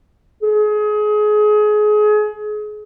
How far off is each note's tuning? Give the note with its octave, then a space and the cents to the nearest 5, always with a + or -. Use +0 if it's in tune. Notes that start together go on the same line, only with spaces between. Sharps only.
G#4 +25